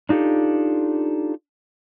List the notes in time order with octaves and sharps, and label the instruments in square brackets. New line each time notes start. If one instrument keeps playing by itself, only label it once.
[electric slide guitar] D4 D#4 F4 G4 A4